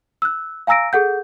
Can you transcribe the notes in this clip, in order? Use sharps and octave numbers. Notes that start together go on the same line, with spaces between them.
E6 F#6
F5 G#5 A#5 E6 A#6 D7
G#4 A4 F#5 G6